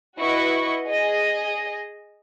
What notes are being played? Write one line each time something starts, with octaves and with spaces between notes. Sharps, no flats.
E4 F#4 B4 D#5 C#6
G#4 D#5